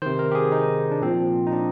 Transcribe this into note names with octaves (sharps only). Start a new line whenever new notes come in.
C3 D#3 C5
A#4
G4
G#4
D#4
D4
A#2 F3 C4
D#4
D4